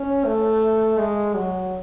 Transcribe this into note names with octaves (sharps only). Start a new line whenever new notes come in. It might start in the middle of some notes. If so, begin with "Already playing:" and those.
Already playing: C#4
A3
G#3
F#3